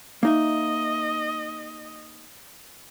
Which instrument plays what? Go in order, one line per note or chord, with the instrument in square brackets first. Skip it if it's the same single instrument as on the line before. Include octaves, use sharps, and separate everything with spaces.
[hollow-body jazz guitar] A#3 D#4 E5 [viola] D#5